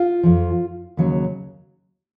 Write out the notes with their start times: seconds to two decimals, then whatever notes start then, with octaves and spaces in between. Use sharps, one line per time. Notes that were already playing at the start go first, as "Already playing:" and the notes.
Already playing: F4
0.23 F2 F3
0.97 D#2 C#3 F#3